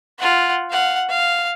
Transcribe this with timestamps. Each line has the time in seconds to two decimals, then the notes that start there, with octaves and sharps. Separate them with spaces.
0.19 F4 F#5
0.71 F5 F#5
1.09 F5